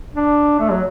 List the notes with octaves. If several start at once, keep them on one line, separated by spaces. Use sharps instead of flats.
D4
A3
F#3